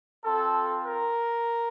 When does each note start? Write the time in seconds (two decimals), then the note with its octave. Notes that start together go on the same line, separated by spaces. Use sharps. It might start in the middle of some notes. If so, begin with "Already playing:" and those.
0.25 C4 F4 A4
0.85 A#4